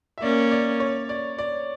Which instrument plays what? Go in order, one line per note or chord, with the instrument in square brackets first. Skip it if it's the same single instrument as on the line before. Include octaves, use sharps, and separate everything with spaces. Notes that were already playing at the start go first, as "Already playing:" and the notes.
[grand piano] E5
[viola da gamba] A#3 C#4 [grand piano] D5
[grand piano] D5
C#5
D5
D5